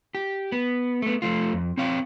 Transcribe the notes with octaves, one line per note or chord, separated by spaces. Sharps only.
G4
B3
A3 B3
F3 A3 F4
F2
C4 C#5 F5 G5